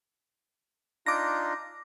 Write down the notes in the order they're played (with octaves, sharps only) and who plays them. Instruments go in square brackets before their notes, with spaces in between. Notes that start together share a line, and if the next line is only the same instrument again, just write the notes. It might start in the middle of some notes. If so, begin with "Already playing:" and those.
[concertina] D4 D#4 F4 [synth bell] D6 A#6